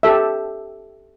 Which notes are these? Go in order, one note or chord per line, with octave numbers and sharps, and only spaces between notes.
G4 A4 E5